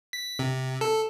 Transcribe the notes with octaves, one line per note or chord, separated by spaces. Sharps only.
B6
C3
A4